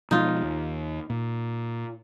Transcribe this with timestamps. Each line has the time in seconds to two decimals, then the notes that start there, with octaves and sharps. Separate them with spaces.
0.11 B2 F3 G#3 D#4 F4
0.42 D#2
1.10 A#2